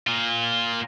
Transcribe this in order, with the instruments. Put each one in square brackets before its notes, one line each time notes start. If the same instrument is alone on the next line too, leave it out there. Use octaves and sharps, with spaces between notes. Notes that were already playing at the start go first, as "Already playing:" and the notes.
[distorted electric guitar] A#2 F4